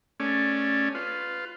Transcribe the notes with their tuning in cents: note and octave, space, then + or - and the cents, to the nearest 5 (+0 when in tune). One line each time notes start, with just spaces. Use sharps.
A3 +0 C#4 +0 D5 +0
F4 +0 B4 +25